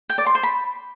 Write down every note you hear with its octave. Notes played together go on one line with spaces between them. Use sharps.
G5
D5
C6
C5
B5